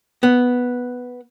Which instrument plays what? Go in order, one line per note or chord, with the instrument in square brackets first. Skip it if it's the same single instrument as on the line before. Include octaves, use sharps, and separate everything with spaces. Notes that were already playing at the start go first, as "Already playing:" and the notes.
[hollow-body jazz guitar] B3